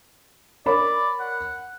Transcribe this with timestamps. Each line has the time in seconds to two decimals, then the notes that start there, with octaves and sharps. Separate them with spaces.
0.66 A#4 C#5 D5 B5
1.20 F#5